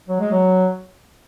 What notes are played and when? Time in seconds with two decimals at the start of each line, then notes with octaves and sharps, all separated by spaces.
0.08 F#3
0.20 G#3
0.31 F#3